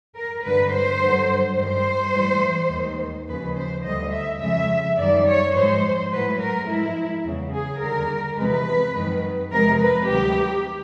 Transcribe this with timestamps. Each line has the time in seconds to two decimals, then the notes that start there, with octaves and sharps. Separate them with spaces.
0.16 A#4
0.43 G2 D3 G3 B4
0.72 C5
1.01 G2 D3 F#3
1.57 G2 D#3 G3 C5
2.13 A2 E3 G3
2.71 D#2 D#3 G#3
3.28 D#2 C#3 F3 B4
3.57 C5
3.84 D2 D3 G3 D#5
4.12 E5
4.41 F2 C#3 F3 G#3 E5
4.97 F#2 D#3 G3 D5
5.27 C#5
5.54 G#2 F3 G#3 C5
6.11 A2 F#3 B4
6.40 A#4
6.68 G#2 F3 G#3 E4
7.25 E2 C#3 F#3
7.53 G#4
7.81 D#2 D3 G3 A#4
8.38 E2 C3 F3 G#3 B4
8.95 F#2 D#3 G#3
9.51 F2 C3 F3 G#3 A#4
9.81 B4
10.08 D2 C3 D#3 F#3 G4